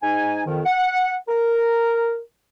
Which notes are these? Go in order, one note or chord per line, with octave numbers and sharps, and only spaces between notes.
G#2 D#4 G#5
F2 D#3
F#5
A#4